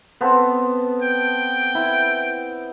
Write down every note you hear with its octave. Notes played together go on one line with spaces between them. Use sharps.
B3 C4 A4
G5
E4